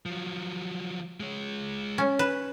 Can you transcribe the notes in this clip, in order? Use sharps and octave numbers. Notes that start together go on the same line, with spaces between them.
F3 F#3
G#3 C#5
C#4
B4